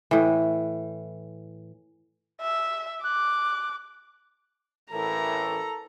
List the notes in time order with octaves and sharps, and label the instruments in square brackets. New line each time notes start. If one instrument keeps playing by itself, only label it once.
[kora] A2 E3
[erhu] E5
[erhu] D6 [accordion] F#6
[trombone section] A1 A2 E3 [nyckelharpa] E4 A#4 [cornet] A4 [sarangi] A#5